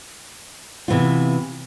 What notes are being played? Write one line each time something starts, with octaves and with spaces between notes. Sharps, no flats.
C3 E3 B3 F4